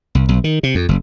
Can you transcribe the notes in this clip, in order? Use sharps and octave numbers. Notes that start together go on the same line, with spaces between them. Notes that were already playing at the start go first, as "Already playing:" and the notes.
C2
B1
D#3
C3
F2
F#1